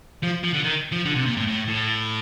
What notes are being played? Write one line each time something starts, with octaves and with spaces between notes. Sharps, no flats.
F3
F3
D3
D#3
F3
D3
C3
A#2
A2
A2
A2